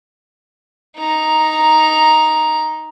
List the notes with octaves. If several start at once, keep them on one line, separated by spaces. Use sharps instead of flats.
D#4 A#5